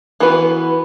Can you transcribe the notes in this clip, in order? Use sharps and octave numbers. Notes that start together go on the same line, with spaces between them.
E3 B3 F#4 B4